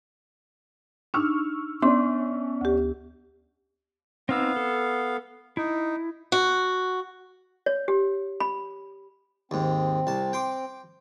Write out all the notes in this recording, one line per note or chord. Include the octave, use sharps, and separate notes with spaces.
D4 D#4 C#6 E6 F6
B3 C#4 D4 C6
D2 G4
B3 C4 D#4 F5 E6
A4
D#4 E4
F#4
C#5
G4
B5
D#2 G#2 C4
C2 A5
G5 C6 D6